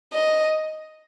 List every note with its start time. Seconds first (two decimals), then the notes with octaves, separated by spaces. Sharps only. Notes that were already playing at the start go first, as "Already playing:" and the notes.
0.13 D#5